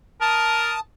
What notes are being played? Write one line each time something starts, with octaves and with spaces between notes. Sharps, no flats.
A#4 A5 D#6